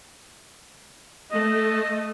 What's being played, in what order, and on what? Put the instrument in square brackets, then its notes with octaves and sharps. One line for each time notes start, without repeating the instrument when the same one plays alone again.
[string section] A3 [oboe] D#5